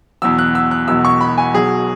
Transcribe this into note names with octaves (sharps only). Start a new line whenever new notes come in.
E2 B2 F#3 E6
F#6
E6
F#6
E1 E2 B2 F#3 E6
C#6
B5
G#5
B1 B2 F#3 G#4